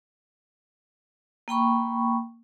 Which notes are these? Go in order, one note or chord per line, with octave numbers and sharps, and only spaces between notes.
A#3 G5 B5 C#6